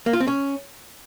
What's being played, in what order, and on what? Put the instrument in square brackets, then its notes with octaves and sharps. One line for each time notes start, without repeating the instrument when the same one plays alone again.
[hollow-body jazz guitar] A#3
F4
C4
C#4